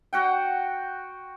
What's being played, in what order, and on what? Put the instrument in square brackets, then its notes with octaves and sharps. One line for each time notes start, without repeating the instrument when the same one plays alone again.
[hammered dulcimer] F#4 F#5 G5